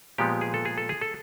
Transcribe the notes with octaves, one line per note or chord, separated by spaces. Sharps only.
A#2 F3 G#3 B3 G4
G#4
A4
G#4
A4
G#4
A4